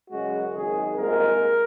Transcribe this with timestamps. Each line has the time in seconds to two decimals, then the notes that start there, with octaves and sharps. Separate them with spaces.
0.11 F#2 C#3 G#3 F#4
0.52 G#1 F#2 D#3 G#4
0.95 C2 A#2 G#3 A#4